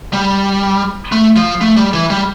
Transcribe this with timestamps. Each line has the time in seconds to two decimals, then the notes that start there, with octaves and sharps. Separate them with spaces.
0.13 G3
1.12 A3
1.36 F3
1.61 A3
1.77 G3
1.94 E3
2.10 G3